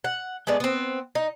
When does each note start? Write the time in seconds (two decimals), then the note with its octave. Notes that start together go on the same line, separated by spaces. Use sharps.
0.04 F#5
0.47 G#3 A3 B3 D5
0.60 B3 C4
1.15 D#4